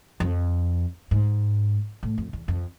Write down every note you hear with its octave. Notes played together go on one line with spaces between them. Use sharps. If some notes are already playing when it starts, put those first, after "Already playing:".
F2
G#2
A2
F2
E2
F2